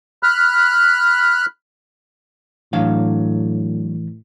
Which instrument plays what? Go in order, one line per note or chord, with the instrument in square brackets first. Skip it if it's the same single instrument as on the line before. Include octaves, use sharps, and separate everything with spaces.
[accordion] B5 F6 F#6
[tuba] A2 [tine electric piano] E3 [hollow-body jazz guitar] F#3 D4 F5